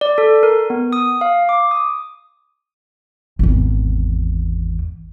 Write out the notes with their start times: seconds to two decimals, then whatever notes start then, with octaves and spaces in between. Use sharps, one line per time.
0.01 D5
0.18 A4
0.43 A#4
0.70 B3
0.93 D#6
1.21 F5
1.49 D6
1.71 D#6
3.39 G#1 E2